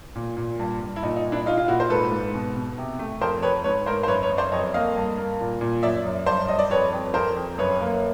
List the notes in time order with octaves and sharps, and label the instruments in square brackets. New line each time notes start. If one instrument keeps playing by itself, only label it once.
[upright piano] A#2
A#2
G2
G2
E4
A#2 D#4
D#4
A#2
D4 E4
A#2 D#4 F4
F4
A#2 E4 F#4
C5
G#2 A4 B4
G#2
B2
B2
C3
A3
F2 A#4 C5
F2 B4 C#5
G#2 B4 C#5
G#2 A#4 C5
C5
F#2 B4 C#5
B4 C#5
F#2
C5 D5
F2 C#5 D#5
A#3 D#5 F5
G2
A#3
A#2
A#2
F#2 D5 E5
F#2
G2 C5 D5
G2 D#5
D5
F2 B4 C#5
F2
F2 A#4 C5
F2
F#2 B4 C#5
A#3